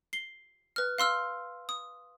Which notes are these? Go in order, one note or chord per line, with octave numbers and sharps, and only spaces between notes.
C7 G7
B4 F6
F5 C6 E6 F6
D#6